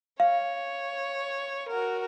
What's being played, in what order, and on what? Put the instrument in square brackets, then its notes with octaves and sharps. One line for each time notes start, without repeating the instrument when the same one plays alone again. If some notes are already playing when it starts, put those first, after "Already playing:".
[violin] C#5 [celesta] F5
[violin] F#4 A#4